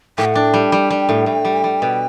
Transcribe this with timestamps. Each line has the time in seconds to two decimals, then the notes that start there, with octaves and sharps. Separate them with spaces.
0.18 A2 G5
0.25 F#5
0.34 D4 G5
0.54 G3
0.72 G3
0.90 G3
1.09 A2
1.26 A2
1.45 G3
1.64 G3
1.82 B2